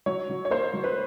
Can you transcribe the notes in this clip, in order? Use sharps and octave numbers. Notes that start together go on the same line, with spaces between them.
F#3 C#5
F#3
C#5
A#3 C5
F#3
B4